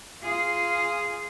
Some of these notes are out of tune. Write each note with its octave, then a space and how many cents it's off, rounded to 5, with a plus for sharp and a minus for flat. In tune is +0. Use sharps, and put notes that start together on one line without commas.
F4 -10 G#4 +0